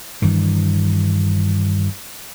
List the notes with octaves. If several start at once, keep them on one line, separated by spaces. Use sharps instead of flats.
G2 D#3 E3